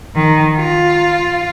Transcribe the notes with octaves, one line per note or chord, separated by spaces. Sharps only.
D#3
F4